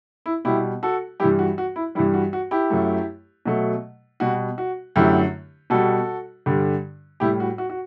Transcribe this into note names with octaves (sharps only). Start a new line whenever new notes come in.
E4
B2 G3 E4 G4
F#4 A4
G2 E3 G3 E4 G4
F#4
F#4
E4
G2 E3 G3 E4
F#4
F#4
E4 G4
F#2 F#3 A3
B2 F#3 A3
B2 G3 F#4
F#4
F#2 D3 F#3 A3 E4 G4
B2 G3 F#4 A4
G2 D3 G3
A2 G3 E4 G4
F#4
F#4
F#4